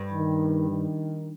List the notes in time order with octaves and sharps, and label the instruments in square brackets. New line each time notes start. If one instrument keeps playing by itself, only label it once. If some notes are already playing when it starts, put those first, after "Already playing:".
Already playing: [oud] G2
[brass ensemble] D#3
D#3